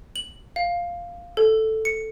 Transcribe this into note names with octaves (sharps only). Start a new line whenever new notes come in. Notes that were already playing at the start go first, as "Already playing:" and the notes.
F#7
F5
A4
C#7